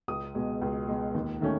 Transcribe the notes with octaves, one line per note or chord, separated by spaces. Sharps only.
C#2 D#6
B2 G#3
C#2
B2 G#3
D#2
D#3 A3 C#4